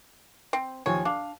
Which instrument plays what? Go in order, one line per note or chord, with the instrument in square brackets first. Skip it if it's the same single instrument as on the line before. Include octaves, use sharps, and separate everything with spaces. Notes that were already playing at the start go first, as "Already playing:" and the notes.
[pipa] C4
[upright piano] D#2 F3 G#5 [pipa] C#5
[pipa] D4 [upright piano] F5